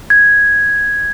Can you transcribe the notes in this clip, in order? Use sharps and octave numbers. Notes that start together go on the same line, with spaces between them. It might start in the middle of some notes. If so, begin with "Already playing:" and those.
G#6